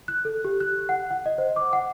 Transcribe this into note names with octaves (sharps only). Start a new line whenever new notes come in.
F#6
A4
G4
F#6
F#5
F#5
D#5
C5
D6
F#5